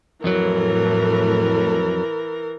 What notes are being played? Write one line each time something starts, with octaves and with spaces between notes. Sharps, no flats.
F2 A2 E3 F#3 A3 A#4